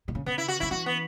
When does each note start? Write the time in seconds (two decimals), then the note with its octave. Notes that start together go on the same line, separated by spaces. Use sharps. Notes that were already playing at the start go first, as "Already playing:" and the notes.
0.08 B2
0.15 C#3
0.26 C#3 B3
0.38 E4
0.48 F#4
0.60 C#3 E4
0.71 E3 F#4
0.86 B3